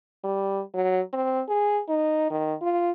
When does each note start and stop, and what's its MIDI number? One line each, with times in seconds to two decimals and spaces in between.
0.24 0.61 55
0.74 1.01 54
1.13 1.41 60
1.49 1.81 68
1.89 2.27 63
2.30 2.54 51
2.62 2.91 65